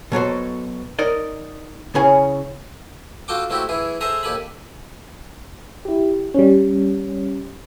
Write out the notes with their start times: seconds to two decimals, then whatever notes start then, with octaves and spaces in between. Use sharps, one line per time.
0.12 B2 F#3 A4 C5
0.99 D#4 A#4 D5 D#5
1.95 C#3 C#4 E4 G#4 F5 G#5
3.28 F4 F#4 A4 G5 D6
3.50 A3 C4 E4 F#4 G4
3.69 E3 E4 G#4
4.01 G#4 A4 C5 E5 G#5 A#5
4.23 D#2 G4 A4 G#5 B5
5.85 E4 G4
6.34 G3 C#4